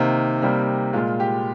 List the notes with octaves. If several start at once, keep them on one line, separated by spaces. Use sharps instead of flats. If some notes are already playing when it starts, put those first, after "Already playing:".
Already playing: C3 D#3 A#3 D#4
C3 G3 A#3
A#2 G#3 F4
G4